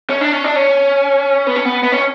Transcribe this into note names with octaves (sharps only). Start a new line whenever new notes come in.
C#4
D4
C#4
D4
C#4
B3
C#4
B3
B3
C#4